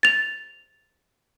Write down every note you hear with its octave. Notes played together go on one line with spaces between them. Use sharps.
A6 F7